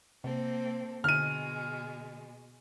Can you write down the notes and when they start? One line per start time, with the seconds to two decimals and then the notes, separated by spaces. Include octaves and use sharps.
0.24 C3 A#3 C4 A4
1.04 B2 D3 G#3 F6 D#7